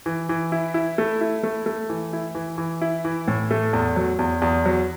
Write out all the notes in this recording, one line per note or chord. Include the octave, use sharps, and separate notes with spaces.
E3
E3
E4
E4
A3
E4
A3
A3
E3
E4
E3
E3
E4
E3
A2
A3
E2
F#3
E2
E2
F#3